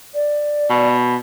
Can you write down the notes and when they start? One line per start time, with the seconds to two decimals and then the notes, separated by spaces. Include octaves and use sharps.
0.14 D5
0.70 B2